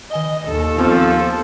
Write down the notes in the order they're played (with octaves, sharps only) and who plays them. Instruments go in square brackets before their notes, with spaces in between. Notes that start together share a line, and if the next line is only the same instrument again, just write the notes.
[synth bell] D#3 G#5 G7 [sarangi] D#5
[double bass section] D#2 [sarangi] A4
[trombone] F3 [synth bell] B3 C4